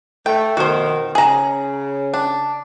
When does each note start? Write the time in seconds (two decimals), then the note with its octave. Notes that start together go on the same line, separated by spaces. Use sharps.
0.26 A3 G5
0.57 F2 B2 D#3 F#4 C5
1.15 C#3 G#4 A#5
2.14 D4